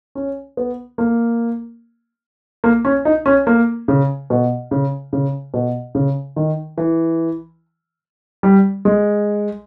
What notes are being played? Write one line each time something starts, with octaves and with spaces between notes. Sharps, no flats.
C#4
B3
A#3
A#3
C#4
D#4
C#4
A#3
C#3
B2
C#3
C#3
B2
C#3
D#3
E3
G3
G#3